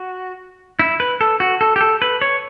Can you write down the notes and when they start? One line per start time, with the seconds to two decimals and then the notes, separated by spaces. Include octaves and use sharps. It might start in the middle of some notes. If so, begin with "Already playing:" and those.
Already playing: F#4
0.79 E4
1.00 B4
1.21 A4
1.40 F#4
1.61 A4
1.76 G4
1.81 A4
2.02 B4
2.21 C#5